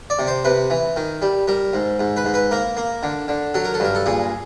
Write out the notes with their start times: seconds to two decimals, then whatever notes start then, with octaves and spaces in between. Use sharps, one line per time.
0.10 D5
0.19 C3
0.27 C5
0.44 C3 B4
0.70 E3
0.96 D#3
1.22 G3
1.48 G3 A#4
1.73 G#2
2.00 G#2
2.17 B4
2.25 G#2
2.34 B4
2.51 A#3 A#4
2.77 A#3
3.03 D3
3.28 D3
3.54 F#3 A4
3.65 A#4
3.74 A4
3.80 G2 A#4
3.95 A4
4.06 A#2 G#4